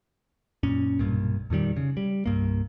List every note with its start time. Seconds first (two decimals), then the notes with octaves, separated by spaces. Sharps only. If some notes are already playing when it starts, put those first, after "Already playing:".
0.63 F#2 A#2 C#4
0.99 B1 G2 A#2
1.50 F2 A#2 D#3 G3
1.77 C#3
1.97 G3
2.26 C2 G2 A#3